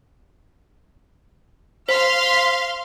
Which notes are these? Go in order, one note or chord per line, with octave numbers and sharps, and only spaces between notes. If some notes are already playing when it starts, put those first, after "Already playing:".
C5 F5 C6 F6 B6